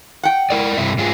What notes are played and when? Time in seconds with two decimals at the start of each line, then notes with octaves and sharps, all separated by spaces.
0.23 F#5 G5
0.50 E4 A#4 D5
0.77 G2 C3 E4
0.98 G#2 F4 G#4